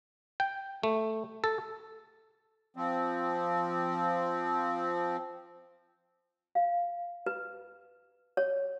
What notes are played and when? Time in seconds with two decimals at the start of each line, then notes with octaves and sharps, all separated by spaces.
0.40 G5
0.83 A3
1.44 A4
2.76 F3 C4
6.55 F5
7.26 B4
8.37 C#5